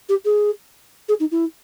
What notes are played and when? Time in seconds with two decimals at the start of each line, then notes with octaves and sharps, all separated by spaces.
0.09 G4
0.25 G#4
1.08 G#4
1.20 D#4
1.31 E4